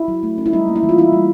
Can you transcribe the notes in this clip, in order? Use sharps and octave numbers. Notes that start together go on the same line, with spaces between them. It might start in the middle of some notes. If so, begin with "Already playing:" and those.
Already playing: E4
F#3
A3
C#4
E4
G3 D#4
A#3
E4
E3
F4
E3 E4
G3